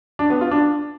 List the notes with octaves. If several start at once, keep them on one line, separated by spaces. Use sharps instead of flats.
D4
B3
F4
D4